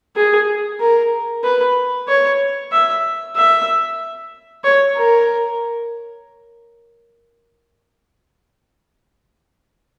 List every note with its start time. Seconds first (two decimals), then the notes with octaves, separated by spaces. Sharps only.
0.16 G#4
0.80 A#4
1.44 B4
2.08 C#5
2.72 E5
3.36 E5
4.64 C#5
4.96 A#4